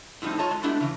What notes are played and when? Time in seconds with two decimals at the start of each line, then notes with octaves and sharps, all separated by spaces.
0.22 A2 F3 G3 C4 D#4
0.38 F4 C#5 D#5 A5 A#5
0.51 G#3
0.63 G#3 A3 B3 D4 E4 G4
0.80 C#3 E3